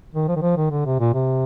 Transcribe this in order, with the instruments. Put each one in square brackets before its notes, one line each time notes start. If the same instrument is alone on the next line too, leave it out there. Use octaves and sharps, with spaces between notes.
[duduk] D#3
F3
D#3
F3
D#3
D3
C3
A#2
C3